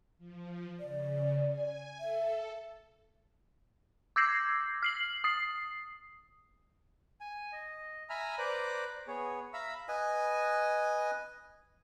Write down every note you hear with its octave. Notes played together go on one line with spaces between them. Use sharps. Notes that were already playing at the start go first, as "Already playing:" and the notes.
F3
C#3 D5
G#5
A4 E5
D6 E6 G6 G#6 A#6 C7
F6 C7 F#7
D#6 C7
G#5
D#5
E5 G#5 A#5 B5 F6
B4 C5 D5 A#5 D6 F#6
B3 G#4 C#5
E5 F5 A#5 B5 E6
B4 D#5 G#5